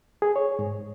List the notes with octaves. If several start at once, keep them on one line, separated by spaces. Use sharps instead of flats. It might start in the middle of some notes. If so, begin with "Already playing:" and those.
G#4
C#5
G#2